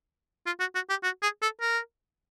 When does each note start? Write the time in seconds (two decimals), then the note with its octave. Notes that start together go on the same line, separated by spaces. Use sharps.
0.46 F4
0.60 F#4
0.75 F#4
0.90 G4
1.03 F#4
1.22 G#4
1.42 A4
1.61 A#4